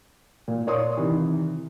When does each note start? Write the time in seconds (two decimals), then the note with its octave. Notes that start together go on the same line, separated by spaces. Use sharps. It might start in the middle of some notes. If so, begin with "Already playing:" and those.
0.48 A#2
0.67 A#4 C#5 D5 C6 C#6 D#6
0.97 C3 D#3 E3